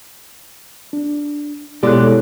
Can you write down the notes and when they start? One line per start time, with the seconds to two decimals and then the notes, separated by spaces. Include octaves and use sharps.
0.93 D4
1.83 B2 G#3 E4 G4 A4 C#5 D5 F#6